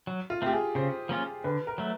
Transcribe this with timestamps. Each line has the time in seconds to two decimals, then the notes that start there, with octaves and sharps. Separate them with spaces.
0.07 F#3
0.30 F4
0.42 A3 C4 G4
0.53 G#4
0.75 C#3 C5
1.09 F3 A#3 C#4 F4
1.44 D3 B4
1.67 A#4
1.78 F#3 A3